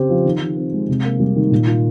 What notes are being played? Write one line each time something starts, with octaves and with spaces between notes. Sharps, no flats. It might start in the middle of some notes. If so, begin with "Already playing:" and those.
Already playing: C#3 C4 G4
F3
D#3
D#3
C4
G#3
C3
A#3
G3
D#3
A#2
F4